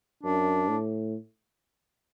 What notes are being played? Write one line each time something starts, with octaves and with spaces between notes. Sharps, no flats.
F#2 D4
A2